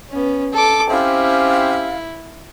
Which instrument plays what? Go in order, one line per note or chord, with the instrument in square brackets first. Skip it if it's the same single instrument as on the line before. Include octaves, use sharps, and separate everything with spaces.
[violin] B3 C#4
A4 D6
[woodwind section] C4 C#4 G4 [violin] E4 [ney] F5